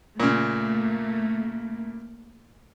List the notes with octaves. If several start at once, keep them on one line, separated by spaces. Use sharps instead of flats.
A#2 C#3 A3 A#3